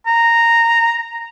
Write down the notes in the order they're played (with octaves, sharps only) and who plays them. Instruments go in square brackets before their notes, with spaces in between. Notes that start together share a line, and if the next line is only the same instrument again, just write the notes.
[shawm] A#5